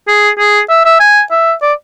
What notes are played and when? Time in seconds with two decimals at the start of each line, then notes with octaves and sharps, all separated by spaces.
0.08 G#4
0.39 G#4
0.69 E5
0.85 E5
1.00 G#5
1.31 E5
1.62 D5